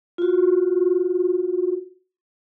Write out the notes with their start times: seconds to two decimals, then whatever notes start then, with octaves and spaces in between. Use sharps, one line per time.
0.18 F4 F#4